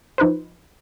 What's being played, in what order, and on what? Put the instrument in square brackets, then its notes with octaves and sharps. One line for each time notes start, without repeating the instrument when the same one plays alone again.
[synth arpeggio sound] F3 D#4 B4 C5